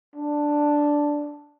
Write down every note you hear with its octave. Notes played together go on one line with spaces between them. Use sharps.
D4